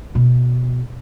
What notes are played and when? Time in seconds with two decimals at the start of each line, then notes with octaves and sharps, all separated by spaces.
0.15 B2